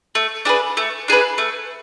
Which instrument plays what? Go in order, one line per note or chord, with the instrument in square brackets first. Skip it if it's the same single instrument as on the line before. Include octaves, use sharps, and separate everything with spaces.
[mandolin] A3
D4 G#4 B4
A3
D4 G#4 B4
A3